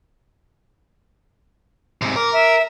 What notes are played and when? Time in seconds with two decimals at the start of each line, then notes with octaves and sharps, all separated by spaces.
2.02 G#2 C3
2.16 A#4 D6
2.33 E5